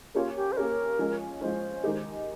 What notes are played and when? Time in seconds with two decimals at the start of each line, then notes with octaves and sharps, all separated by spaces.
0.15 A#3 C#4 F4 G4 C#5
0.36 G4
0.52 C5
0.57 A#3 C#4 G4 A#4 C#5
0.99 F3 G#3 C#4
1.41 F3 G#3 C#4 C5
1.83 D#3 G#3 D#4 G4